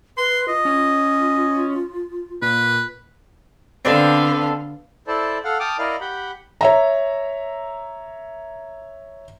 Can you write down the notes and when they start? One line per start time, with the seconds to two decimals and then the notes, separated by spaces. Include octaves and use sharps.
0.17 B4 C6
0.48 F4 D#5
0.65 C#4
2.42 A#2 B4
3.85 D3 B3 C4 D4 A4 F5
5.07 E4 A4 C5 D5 A5
5.45 A4 F5 F#5
5.60 G5 A5 D6 D#6 F6
5.79 E4 A#4 D5 D#5 F5
6.01 G4 F#5 B5 G6
6.61 C#5 E5 A#5